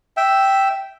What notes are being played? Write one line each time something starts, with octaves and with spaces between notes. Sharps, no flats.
E5 G5